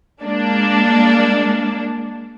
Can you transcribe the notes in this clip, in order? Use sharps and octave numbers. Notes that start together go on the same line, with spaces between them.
G#3 A#3 D4